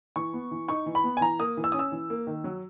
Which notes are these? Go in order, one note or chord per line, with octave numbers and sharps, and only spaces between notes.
E3 C#6
B3
E3
D#4 C#6
E3
B5
B3
G#5
E3 A#5
A#3 D#6
E3
E6
C#4 D#6
E6
E3
A#3
D#3
F#3